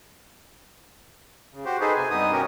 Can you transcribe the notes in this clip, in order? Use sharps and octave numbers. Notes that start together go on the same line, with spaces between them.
C#3
F#4 G4 C5
D#4 G#4 A4 B4 C5
C3 G#5
G2 B3 D#4 D#6
C3 B3 C#4 F#4 G4 A#4